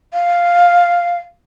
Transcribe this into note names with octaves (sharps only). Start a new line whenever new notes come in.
F5